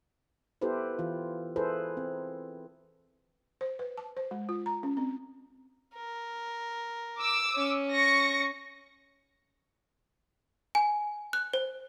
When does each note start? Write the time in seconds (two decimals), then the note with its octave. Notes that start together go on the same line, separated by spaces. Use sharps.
0.61 B3 E4 G4 A4 B4 C5
0.99 E3 F4
1.56 E4 G#4 A4 B4 C5
1.97 C4
3.61 C5
3.79 B4
3.98 A5
4.17 C5
4.31 G#3
4.49 F4
4.66 A#5
4.83 C#4
4.97 C4
5.95 A#4
7.18 D6 E6
7.56 C#4
7.93 C#6 A#6 C#7
10.75 G#5
11.33 F#6
11.54 C5